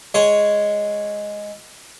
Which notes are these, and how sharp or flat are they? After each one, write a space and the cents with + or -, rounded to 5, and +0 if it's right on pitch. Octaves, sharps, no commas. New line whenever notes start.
G#3 +0 C#5 +0